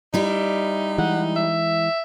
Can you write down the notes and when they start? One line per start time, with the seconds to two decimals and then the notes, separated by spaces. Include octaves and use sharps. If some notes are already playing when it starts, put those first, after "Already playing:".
0.14 G3 D#4 E4 G4
0.98 E3 G#3 F#5
1.36 E5